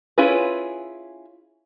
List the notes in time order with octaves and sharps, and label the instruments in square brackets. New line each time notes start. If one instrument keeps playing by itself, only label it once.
[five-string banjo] C#4 E4 F4 G#4 B4